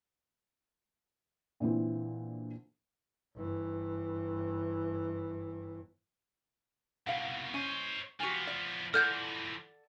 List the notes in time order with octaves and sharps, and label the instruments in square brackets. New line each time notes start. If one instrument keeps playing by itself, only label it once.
[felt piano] A#2 D3 E3 C4
[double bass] G1 E3
[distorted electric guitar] C2 B2 [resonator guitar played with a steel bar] F5 F#5
[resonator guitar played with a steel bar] C#4 [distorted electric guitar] C5 D#5
[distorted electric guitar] F3 B3 [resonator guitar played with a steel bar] F#4 G4 G#5
[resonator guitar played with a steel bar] D5
[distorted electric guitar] E3 F3 [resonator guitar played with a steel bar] A4 D5 F#5 [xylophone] F6 G6 G#6